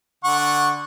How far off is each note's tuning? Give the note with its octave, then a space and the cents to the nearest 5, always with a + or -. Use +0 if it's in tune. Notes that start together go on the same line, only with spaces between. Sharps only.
D3 +0 F#5 -10 C#6 -10